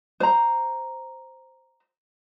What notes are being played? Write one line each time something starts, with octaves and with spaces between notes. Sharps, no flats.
C5 A#5